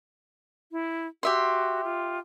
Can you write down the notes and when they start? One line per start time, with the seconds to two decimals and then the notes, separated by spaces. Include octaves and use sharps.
0.72 E4
1.23 F#4 G4 E5 C6
1.84 F4